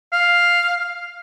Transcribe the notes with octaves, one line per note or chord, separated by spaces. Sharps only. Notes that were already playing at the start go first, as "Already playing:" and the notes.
F5